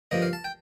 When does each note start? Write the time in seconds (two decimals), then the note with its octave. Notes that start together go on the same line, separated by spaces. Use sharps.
0.11 G2 D3 F3 A#3 D#5
0.22 F5
0.33 A5
0.44 G5